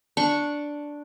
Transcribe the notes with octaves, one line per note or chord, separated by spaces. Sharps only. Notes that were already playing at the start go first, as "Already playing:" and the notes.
D4 C#6